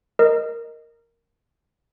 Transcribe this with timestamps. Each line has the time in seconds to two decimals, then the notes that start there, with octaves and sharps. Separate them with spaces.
0.19 A#4 D#5